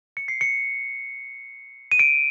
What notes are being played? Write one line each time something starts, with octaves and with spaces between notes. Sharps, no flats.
C#7
C7
C#7
D#7
D7